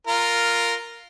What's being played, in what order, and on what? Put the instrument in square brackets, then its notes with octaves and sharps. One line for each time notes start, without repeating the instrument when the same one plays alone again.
[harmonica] F4 A#4